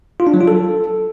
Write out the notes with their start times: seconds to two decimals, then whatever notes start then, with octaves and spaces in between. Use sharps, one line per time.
0.20 F4
0.27 D4
0.34 F#3
0.41 F4
0.48 A4